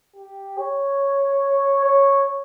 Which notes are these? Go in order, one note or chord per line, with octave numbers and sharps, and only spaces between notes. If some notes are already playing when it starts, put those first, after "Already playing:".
G4
C#5
C#5